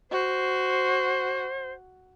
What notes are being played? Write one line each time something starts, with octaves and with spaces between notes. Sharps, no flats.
F#4 C5